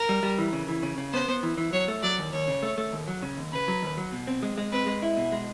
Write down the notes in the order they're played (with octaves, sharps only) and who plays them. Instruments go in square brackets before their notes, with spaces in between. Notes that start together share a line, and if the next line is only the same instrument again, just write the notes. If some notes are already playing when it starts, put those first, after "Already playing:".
Already playing: [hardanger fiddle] A#4
[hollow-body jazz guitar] G3
G3
E3
C#3
E3
C#3
C#3
[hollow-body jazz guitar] B3 [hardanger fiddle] C5
[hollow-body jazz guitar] B3
E3
E3
[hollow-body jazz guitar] F#3 [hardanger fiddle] C#5
[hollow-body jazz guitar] A3
[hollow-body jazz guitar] F#3 [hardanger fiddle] D5
[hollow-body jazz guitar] D#2
[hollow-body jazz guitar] D#2 [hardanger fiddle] C#5
[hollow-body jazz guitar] C#3
A3
A3
D#2
F#3
C#3
D#2
[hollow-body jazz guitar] C#3 [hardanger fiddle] B4
[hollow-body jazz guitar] F#3
D#2
F#3
B2
C4
G#3
G#3
[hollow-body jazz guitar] C4 [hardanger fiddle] B4
[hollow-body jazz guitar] G#3
E4
B2
G#3